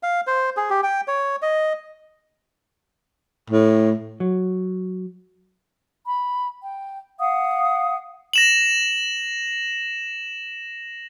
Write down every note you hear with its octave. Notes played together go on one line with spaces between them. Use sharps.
F5
C5
G#4
G4
G5
C#5
D#5
A2
F#3
B5
G5
F5 F#5 D#6
A#6 E7 F#7